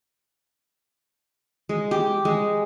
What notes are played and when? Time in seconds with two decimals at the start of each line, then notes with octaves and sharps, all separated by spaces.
1.69 G#3
1.91 G4
2.25 G#3